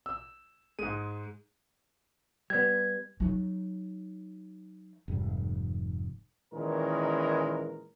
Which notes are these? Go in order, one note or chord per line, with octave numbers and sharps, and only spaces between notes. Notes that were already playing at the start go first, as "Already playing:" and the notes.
E6
G#2 G#3 D#7
G3 B3 G#6
F#3 D#4
F1 G#2 G3
A#2 D#3 E3 G#3 C#4 A#4